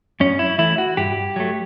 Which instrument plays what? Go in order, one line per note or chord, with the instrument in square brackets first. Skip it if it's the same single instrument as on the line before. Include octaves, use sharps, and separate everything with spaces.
[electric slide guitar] F#2 C#4
E4
E3 A3 E4
F#4
G2 G4
F#3 A3